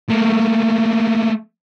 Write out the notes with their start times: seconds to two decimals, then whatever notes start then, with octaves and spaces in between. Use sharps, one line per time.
0.10 A3 A#3